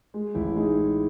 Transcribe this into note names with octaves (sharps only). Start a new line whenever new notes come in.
G#3
A1 E4
G#3 D#4 G#4
A2